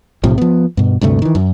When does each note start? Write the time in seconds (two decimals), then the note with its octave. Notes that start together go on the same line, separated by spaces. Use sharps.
0.24 B1 A2 C3 F3
0.38 F3 B3
0.77 G2 B2
1.01 D2 G2 C3 A3
1.22 D#3 E3
1.35 F#2